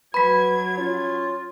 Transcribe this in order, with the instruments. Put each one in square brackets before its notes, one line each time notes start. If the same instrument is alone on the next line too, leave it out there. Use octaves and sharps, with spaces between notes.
[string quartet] F#3 G#6 [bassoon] B4 [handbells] B5 B6
[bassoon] C#4 [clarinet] F4